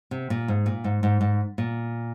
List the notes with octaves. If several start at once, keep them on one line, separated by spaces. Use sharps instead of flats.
C3
A#2
G#2
A#2
G#2
G#2
G#2
A#2